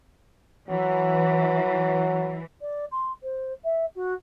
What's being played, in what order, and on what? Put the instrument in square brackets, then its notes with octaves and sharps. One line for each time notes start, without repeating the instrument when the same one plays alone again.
[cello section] E3 [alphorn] F#3
[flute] D5
C6
C5
E5
F#4